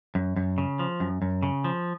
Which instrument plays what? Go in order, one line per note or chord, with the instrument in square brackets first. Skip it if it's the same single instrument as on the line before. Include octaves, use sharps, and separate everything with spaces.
[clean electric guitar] F#2
F#2
C#3
F3
F#2
F#2
C#3
F3